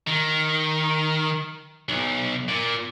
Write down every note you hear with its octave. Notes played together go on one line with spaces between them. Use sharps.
D#3
B1
A#2